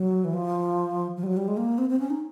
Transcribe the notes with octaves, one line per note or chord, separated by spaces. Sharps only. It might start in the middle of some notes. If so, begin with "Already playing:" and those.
Already playing: F#3
E3
F3
F3
G3
F#3
G3
G#3
A#3
C4
C4
C#4
D#4